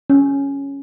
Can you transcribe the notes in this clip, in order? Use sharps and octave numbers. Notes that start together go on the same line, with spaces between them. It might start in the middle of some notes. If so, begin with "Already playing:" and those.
C#4